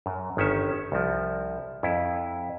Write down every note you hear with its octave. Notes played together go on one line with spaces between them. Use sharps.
F#2
G1 D#3 C#4 E5
C2 F3
F2 E4